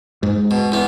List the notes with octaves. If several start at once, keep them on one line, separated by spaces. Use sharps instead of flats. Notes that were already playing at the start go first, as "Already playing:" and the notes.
G#2
B2
E2 B3